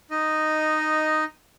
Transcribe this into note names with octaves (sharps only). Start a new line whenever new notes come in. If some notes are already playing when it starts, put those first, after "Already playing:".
D#4 D#5